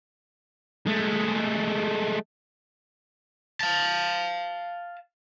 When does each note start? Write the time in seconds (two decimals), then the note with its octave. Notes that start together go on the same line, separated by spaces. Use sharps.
0.87 G#3 A3
3.61 F5 A5